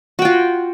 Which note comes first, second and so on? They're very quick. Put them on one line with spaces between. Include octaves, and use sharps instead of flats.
F#4 G5 F4